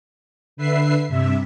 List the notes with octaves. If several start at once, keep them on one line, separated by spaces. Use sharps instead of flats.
D3 B4 E5 C7
G2 C3 E5